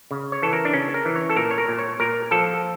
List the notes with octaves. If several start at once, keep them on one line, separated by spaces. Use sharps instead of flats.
C#3
C#5
E3 A4
A#4
D4
C#3 C#4
A#4
E3
C#5
A4
A#2 A#4
C#5
A#4
A#2
C#5
A#2 A#4
F3 A4